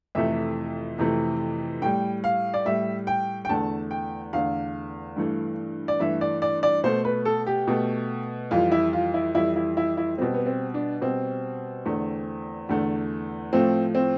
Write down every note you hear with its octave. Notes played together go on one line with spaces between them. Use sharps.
F2 C3 E3 A3 E5
F2 C3 E3 A3
A2 G3 G5
F5
D5
A2 G3 E5
G5
G5
E2 D3 A3 A5
G5
E2 D3 A3 F5
G2 E3 A3
D5
G2 E3 A3 E5
D5
D5
D5
B2 A3 C5
B4
A4
G4
B2 A3
F2 E3 G3 F4
E4
F4
E4
F2 E3 G3 E4
E4
E4
E4
B2 G3 C4
B3
C4
D4
B2 G3 C4
E2 D3 A3
E2 D3 A3
A2 F3 A3 C4
C4